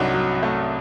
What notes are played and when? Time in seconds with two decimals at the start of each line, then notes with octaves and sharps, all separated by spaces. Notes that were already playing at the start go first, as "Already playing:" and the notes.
Already playing: C2 F#3 D4 D#4 F#4
0.14 F#3
0.43 A3